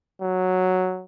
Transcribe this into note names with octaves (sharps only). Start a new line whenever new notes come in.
F#3